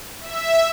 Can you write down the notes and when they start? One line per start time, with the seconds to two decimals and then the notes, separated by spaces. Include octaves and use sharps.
0.21 E5